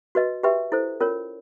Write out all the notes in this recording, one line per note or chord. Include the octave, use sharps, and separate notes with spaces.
F#4 B4 D#5
G4 B4 E5 G5 C6
E4 A4 C5
C#4 F4 A#4 C#5